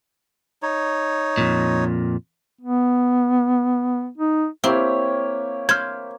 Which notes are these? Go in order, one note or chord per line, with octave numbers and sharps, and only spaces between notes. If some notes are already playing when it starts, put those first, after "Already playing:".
D#4 C#5
F2 A#2
B3
D#4
A#3 C4 E4 G4 C#5
C5 F6 G#6